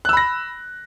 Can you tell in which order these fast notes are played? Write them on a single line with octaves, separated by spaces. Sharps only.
F#6 E6 B5 A#6